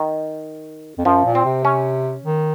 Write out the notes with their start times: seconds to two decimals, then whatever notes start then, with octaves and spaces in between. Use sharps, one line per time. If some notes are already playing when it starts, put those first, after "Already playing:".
Already playing: D#3
0.98 F2
1.05 F#2 F3
1.25 A#2
1.35 C4
1.45 C3
1.65 C#4
2.24 D#3